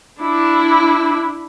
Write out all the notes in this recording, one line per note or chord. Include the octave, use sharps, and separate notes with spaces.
D4 E4